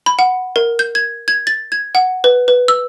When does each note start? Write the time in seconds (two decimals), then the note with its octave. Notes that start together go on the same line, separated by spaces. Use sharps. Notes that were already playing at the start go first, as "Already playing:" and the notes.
0.06 B5
0.19 F#5
0.56 A#4
0.79 G6
0.95 G#6
1.28 G#6
1.47 A6
1.72 G#6
1.95 F#5
2.24 B4
2.48 B4
2.68 E6